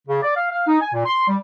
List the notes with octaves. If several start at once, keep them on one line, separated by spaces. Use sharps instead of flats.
C#3
D5
F5
F5
D#4
G#5
A#2
C6
G3